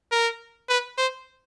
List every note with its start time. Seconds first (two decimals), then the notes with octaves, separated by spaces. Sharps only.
0.12 A#4
0.69 B4
0.98 C5